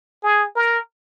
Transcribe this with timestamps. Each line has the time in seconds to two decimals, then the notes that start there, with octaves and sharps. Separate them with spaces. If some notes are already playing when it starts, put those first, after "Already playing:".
0.23 G#4
0.55 A#4